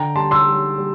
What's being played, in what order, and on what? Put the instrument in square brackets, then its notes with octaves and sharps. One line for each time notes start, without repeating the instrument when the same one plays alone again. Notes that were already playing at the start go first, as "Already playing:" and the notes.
Already playing: [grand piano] D3 G5 A#5
G3 A5 C6
C6 E6
G3
G3